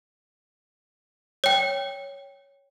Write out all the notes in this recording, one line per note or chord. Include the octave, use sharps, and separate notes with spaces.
C#5 G5